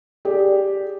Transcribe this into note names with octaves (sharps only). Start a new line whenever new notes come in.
G4 G#4 D5